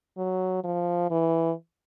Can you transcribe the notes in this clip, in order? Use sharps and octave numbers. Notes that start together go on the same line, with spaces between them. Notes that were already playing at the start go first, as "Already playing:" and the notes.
F#3
F3
E3